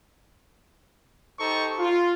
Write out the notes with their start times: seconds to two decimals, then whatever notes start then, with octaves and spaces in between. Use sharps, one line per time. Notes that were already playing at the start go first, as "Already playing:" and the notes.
1.39 D#4 G4 A4 C5 A5 C#6
1.79 F4